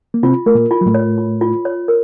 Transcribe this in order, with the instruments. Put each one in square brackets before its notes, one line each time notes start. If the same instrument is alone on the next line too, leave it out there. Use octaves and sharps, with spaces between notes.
[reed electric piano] A#3
[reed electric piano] C3 C4 [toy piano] F4
[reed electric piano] A3 [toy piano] A#4
[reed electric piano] A#2 A#3
[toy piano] F4
[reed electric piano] F#3
A2 A3
[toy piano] C#5
F4
F4
C#5
A#4